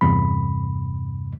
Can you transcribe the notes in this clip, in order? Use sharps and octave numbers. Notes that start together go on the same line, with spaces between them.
E2 G2 C3 B5